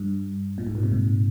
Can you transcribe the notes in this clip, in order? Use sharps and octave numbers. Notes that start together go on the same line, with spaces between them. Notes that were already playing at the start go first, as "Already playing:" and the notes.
Already playing: G2
A#2
G#2
A#2
C3
G#2